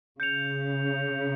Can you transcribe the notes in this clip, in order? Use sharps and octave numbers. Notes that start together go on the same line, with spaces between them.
C#3 G6 C#7 F7